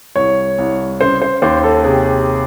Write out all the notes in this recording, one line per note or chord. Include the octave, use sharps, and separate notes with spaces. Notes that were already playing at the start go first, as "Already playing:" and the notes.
C2 C#5
C2
C#3 C5
C5
D#2 C5
A4
C3 G#4